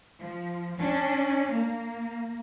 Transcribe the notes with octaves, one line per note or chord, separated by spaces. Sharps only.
F3
C#4 D4
A#3